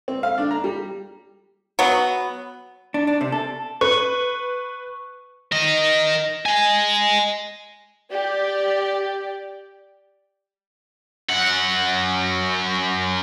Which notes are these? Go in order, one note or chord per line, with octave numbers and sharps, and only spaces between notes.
C4
F5
D4
A#5
G3
F#3 B3
D4
D4
C3
A4
B4 C#6
A#4 D#5
D#5 G#5
G4 D5
F#2 F#5